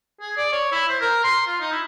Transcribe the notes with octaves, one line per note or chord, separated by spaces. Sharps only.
G#4
D5
C#5
E4
C5
A#4
C6
F4
D#4
E4